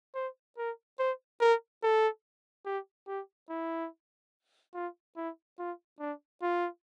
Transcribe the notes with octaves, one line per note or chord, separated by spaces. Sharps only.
C5
A#4
C5
A#4
A4
G4
G4
E4
F4
E4
F4
D4
F4